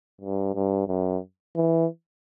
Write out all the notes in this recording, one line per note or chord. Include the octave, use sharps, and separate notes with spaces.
G2
G2
F#2
E3